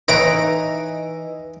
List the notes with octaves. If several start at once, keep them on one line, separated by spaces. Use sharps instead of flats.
E3 D#4 B4 C#5 D#5 E5 A#5 D7